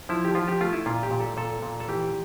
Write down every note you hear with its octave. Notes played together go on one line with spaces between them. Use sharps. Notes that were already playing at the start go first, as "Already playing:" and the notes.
F3 E4
G4
F3 F4
G4
A3 F4
E4
A#2 F4
G4
A#2
A4
A#2 A4
A#2
A4
E3 G4